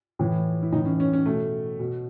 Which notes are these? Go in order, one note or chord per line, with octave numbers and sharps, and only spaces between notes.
A2 E3
E4
A2 E3 D#4
C#4
C#4
C#4
B2 A3
B2